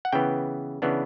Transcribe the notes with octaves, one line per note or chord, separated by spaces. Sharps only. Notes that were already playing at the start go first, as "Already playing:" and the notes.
F#5
C#3 E3 B3 G5
C#3 E3 B3 D4